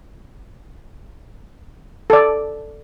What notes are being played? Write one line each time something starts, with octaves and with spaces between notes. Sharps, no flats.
A4 D5